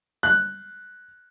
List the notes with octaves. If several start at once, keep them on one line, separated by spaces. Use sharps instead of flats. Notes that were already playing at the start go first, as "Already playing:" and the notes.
F#6